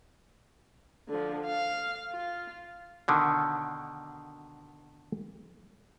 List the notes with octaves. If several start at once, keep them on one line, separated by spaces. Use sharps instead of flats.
D3 F3
F5
F4
B2 D3 D#3